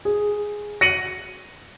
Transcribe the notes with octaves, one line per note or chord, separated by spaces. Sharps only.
G#4
A#6 C#7 D#7 F#7